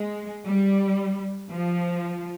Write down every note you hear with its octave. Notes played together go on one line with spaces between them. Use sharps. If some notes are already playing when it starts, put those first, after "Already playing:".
Already playing: G#3
G3
F3